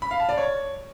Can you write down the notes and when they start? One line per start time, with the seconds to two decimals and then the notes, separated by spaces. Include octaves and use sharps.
0.02 B5
0.11 F5
0.20 A5
0.29 D5
0.38 C#5